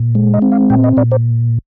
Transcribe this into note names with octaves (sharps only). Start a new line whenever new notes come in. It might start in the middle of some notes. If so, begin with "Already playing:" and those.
Already playing: A#2
G#3
D#5
C4
F5
A#2 G5
D#5
A#2 D5
C5